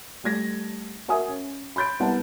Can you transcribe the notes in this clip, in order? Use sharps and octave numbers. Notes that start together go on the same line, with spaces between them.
G3 A3 G#6 A#6
F#4 A#4 E5 G#5 D#6
C#4
B5 C6 G6 A6 D7
C2 B3 F#5 A5